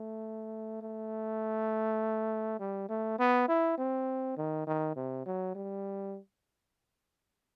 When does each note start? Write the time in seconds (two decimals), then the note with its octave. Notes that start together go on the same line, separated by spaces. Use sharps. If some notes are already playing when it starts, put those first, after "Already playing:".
Already playing: A3
0.82 A3
2.60 G3
2.89 A3
3.19 B3
3.48 E4
3.78 C4
4.37 D#3
4.67 D#3
4.96 C3
5.26 F#3
5.55 G3